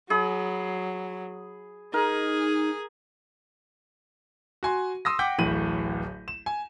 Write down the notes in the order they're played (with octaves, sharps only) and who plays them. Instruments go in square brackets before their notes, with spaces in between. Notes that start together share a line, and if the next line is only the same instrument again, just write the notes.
[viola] F#3 [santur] G#4 B5 D#6
[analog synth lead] D#4 [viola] G#4 [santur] A#4
[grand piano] F#4 G#5 C6
C6 D#6 E6 A#6
F#5 G5 D6 G6 B6
D1 A1 A2 D#7 F#7
E7
G#5